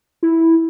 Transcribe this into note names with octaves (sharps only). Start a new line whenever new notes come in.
E4